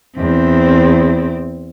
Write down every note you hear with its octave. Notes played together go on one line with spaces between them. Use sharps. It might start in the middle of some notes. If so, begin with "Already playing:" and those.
E2 C4